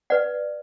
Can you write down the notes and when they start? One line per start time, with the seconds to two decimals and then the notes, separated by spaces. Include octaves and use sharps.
0.10 B4 D5 F#5